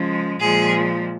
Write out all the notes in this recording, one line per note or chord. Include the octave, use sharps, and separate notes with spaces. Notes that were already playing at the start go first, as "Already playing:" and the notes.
Already playing: C#3 F3 G#3
A#2 F3 G#3 G#4